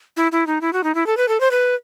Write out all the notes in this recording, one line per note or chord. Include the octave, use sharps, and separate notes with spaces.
E4
E4
D#4
E4
F#4
D#4
E4
A4
B4
A4
C5
B4